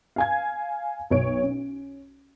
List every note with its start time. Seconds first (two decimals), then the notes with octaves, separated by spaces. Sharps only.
0.16 F5 G#5 G#6
1.10 B1 C#5 D7
1.43 C#4